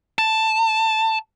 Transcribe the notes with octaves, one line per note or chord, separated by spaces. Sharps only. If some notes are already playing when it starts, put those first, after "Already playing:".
A5